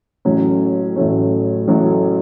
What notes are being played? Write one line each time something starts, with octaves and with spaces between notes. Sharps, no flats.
A1 A2 F#3 A3 C#4
A1 A2 F#3 A3 C#4
A1 A2 F#3 A3 C#4